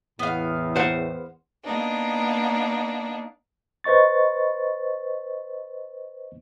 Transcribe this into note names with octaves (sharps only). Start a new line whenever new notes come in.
E2 A2 B3 F5
C5 F#5
A#3 B3 D4 D#4
B4 C5 D#5 C#6 A6